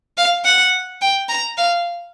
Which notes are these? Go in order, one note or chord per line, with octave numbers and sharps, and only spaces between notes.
F5
F#5
G5
A#5
F5